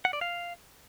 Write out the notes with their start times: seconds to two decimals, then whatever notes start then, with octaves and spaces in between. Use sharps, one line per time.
0.05 F#5
0.13 D5
0.21 F5